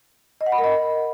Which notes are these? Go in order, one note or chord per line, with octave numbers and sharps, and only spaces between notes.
D#5
F#5
B5
A#4
D#5